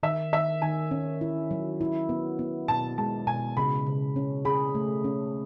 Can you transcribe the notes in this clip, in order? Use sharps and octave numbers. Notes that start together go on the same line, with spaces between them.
D#3 E5
D#3 E5
D#3 G#5
C#4
E4
F#3
E4
B3
B3
B2 A5
G#3 A5
B2 G#5
C#3 B5
C#3
C#4
G#4 B5
A3
C#4